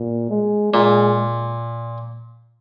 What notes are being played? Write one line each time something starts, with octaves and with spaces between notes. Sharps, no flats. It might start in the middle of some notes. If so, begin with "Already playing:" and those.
Already playing: A#2
G#3
A#2 G#3